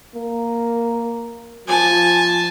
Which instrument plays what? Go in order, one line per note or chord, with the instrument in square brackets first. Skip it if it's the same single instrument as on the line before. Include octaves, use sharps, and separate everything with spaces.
[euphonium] A#3
[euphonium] F3 [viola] G#5 A5